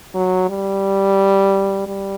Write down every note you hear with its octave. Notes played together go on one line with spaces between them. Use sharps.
F#3
G3
G3